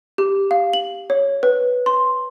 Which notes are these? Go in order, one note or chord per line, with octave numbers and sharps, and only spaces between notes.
G4
F5
F#7
C#5
B4
C6